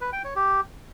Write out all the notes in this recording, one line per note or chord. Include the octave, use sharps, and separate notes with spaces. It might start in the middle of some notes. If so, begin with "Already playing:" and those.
B4
G5
C#5
G4